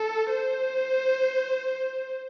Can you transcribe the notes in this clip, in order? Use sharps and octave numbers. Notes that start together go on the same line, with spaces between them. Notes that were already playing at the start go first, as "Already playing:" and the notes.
Already playing: A4
C5